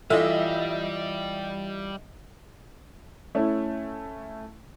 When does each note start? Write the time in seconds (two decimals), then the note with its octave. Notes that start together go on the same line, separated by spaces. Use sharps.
0.10 E3 G3 F4 G4 A4 D#5 E5 G#5
3.35 A3 C#4 E4